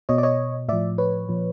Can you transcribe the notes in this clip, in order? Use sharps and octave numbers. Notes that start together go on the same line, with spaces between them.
B2 C#5 D#5
D5
C#5 D#5
A2 F3 D5 E5
B4 C#5
A#2 F3